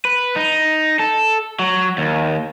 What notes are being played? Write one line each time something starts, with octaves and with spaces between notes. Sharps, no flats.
B4
D#4
A4
F#3
D#2